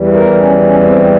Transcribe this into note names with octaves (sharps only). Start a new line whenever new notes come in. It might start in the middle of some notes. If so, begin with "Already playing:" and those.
Already playing: E2 E3 G3
A#4
C#4
C#4
C4